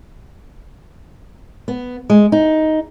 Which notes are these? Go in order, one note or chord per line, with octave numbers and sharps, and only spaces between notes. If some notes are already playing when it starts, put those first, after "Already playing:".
B3
G#3
D#4